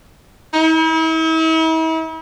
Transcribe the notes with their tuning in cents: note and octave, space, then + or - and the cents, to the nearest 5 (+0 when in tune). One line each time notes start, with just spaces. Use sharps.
E4 -45